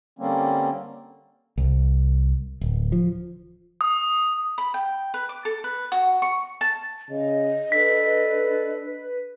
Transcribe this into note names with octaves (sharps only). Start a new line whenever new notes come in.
D3 G3 A#3 C4 C#4
C2
D1
F3
D#6
B5
G5
B4
D6
A4
B4
F#4
C#6
A5
C#3 D#5
D4 A4 B4 B6
B4